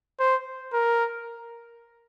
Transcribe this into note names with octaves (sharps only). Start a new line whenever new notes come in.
C5
A#4